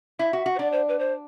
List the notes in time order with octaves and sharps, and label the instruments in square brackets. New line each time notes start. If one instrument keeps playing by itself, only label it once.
[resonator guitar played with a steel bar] E4 [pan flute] E5
[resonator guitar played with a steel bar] F#4
F#4
[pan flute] C5
[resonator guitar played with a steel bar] D4 [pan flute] D5
[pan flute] C5
B4
C5